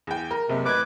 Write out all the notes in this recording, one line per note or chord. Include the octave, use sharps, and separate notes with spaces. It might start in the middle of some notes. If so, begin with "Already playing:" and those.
E2 G5
A#4
F#1 C3
A1 B4 D6 G#6